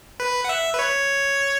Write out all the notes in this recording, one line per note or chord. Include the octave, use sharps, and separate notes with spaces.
B4
F#5
E5
B4
C#5